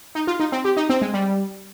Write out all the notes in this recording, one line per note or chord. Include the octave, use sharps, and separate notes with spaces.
D#4
F4
D#4
C4
G4
D#4
C4
G#3
G3